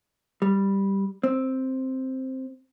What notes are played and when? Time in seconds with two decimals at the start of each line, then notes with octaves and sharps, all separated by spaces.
0.42 G3
1.23 C4